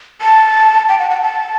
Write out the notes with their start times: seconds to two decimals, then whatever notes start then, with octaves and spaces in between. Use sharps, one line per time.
0.21 A5
0.89 G5
0.99 F#5
1.10 F#5
1.22 A5